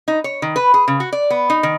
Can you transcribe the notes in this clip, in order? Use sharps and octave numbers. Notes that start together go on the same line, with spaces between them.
D#4
C#5
D#3
B4
G#4
C#3
F#4
D5
B3
D#4
D#3